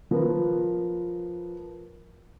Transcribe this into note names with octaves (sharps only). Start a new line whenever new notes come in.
F3 A#4 B4